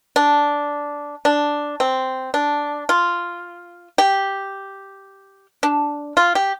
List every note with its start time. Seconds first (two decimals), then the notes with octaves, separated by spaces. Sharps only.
0.16 D4
1.25 D4
1.80 C4
2.34 D4
2.89 F4
3.98 G4
5.63 D4
6.17 F4
6.35 G4